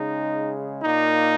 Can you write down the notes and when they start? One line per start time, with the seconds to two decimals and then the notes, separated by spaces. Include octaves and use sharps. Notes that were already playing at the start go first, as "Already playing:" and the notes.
Already playing: C#3 G#3 D#4
0.83 A#2 A#3 D#4